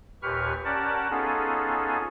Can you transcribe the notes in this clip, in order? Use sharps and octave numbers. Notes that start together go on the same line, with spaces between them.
D#2 A#2 G4 B4 C#6 F6
C#4 G4 A#4 D5 F#5 A5
B3 C#4 D#4 F4 G#4 A4